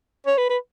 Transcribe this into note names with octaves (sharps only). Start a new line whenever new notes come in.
C#5
B4
B4